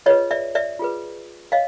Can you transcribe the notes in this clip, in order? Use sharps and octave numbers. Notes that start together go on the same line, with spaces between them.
F4 G#4 B4 C#5 D#5
D5 E5
D5 E5
F4 G#4 B4
C#5 D#5 F5